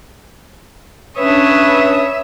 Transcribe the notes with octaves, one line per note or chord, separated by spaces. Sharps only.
C#4 D4 B4 C#5 E5 D#6